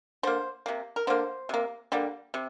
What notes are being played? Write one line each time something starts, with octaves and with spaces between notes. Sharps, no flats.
D3 A#3 C5
C3 A#3
A#4
D3 A#3 C5
C3 A#3
D3 G3 A#3
C3